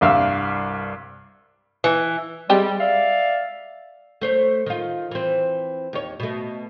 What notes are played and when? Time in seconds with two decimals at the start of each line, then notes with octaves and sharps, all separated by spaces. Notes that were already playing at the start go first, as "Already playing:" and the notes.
0.01 C2 G2 E5 F5 E6
1.84 E3
2.49 G3 G#3 C4 G4
2.80 D5 E5 F5
4.21 A3 C5 C#5
4.66 D#3 F4
5.11 E3 C4
5.93 D#2 C#5
6.20 B2 A3